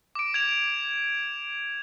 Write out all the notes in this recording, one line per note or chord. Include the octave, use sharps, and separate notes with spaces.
D6 D7
G#6 F7